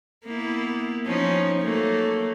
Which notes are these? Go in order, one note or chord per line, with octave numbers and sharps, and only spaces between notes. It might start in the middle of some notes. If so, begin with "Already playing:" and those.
A#3 B3 E4
F3 C#4 D#4
F#3 A3 A#3